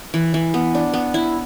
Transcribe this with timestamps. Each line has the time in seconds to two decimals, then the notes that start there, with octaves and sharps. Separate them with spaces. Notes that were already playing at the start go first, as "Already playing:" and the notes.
0.14 E3
0.34 E3
0.54 B3
0.75 D4
0.94 B3
1.14 E4